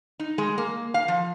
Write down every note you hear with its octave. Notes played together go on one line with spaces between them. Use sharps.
D#4
G#3
A#3
F5
F3